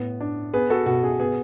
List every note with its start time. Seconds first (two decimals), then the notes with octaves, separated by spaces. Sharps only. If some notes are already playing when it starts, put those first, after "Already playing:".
Already playing: A2 B3
0.21 D4
0.54 B3 G#4 B4
0.70 F#4 A4
0.86 B2 F#4
1.03 G#4
1.20 B3 G#4